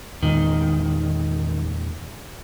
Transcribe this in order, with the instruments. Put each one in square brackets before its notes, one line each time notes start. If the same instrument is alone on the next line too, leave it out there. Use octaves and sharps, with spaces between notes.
[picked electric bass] E2 A#2 G#3 [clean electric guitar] D#3